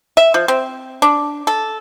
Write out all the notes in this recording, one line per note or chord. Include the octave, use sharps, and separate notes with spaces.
E5
F3
C4
D4
A4